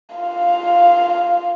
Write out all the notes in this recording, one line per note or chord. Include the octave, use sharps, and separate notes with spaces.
F4 F5